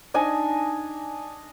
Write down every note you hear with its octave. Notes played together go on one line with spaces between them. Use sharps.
D4 D#4 G#5